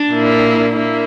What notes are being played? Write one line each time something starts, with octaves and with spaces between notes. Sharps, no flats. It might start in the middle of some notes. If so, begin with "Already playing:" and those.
Already playing: D4
A#2 A#3 E4
A#3 E4